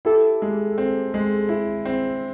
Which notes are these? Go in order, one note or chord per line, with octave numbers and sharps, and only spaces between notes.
E4 G4 A4
G#3
C4
G#3
E4
C4